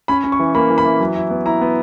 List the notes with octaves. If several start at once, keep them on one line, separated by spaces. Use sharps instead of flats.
C#4 B5
C#4
C#6
E3
A#3 B5
E3
B5
E3
F#3
E4
B3
E4 A#5
B3